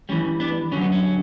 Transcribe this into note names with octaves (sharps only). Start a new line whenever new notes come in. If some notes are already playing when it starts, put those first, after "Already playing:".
G2 E3 G3 C#4
B3 D4
G2 D3 F#3 C#4
B3
C#4